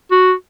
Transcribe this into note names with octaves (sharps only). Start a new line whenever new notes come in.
F#4